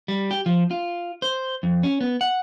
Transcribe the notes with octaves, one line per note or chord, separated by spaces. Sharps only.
G3
G4
F3
F4
C5
F2
C#4
B3
F#5